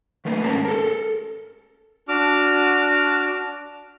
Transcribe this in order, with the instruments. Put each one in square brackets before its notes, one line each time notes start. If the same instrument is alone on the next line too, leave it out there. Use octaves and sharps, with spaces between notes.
[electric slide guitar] D#3 A3 A#3 B4
G#2 C#4 A#4 A5
A4 A#4
[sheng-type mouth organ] D4 F#4 D6 F6